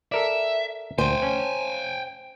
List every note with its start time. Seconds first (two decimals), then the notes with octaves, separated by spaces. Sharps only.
0.12 A4 A#4 D5 E5
0.98 D2 C5 G5 G#5
1.23 C#4